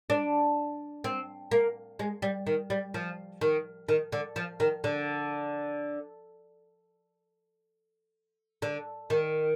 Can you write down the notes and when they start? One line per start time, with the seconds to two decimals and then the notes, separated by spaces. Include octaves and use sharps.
0.10 D4
1.04 C4
1.51 A#3
1.99 G#3
2.22 G3
2.47 D#3
2.70 G3
2.94 F3
3.41 D#3
3.89 D#3
4.12 D3
4.36 F3
4.60 D#3
4.84 D3
8.62 D3
9.10 D#3